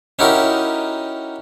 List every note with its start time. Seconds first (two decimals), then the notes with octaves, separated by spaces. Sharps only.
0.19 C#4 D#4 E4 F#4 G4 A#4